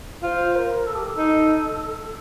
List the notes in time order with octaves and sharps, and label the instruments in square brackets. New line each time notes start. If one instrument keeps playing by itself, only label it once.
[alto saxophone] F4 [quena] C5
[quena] A#4
A4
G4
A#4
A4
[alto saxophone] D#4